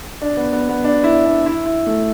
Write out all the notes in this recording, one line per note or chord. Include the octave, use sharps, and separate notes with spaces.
D4
B3
B3
B3
D4
E4
D4
E4
E4
A3